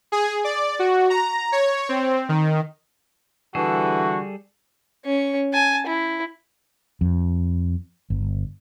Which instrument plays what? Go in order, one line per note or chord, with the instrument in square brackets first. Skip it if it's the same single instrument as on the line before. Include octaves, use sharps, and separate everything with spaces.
[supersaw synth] G#4
D5
F#4
A#5
C#5
C4
D#3
[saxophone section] D3 E3 [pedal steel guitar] G3 G#4 A4 [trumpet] F#4
[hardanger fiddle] C#4 C#6
G#5 A5
E4
[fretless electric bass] F2
G1